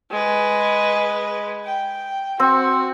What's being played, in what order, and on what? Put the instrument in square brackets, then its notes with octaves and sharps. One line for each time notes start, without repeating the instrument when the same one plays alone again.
[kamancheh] G#3 B4
G5
[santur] C4 [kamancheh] F#4